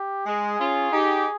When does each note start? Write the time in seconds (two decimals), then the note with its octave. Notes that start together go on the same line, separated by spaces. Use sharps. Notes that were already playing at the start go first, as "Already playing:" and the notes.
Already playing: G4
0.26 G#3 G#4
0.59 C#4 F4
0.92 D#4 G4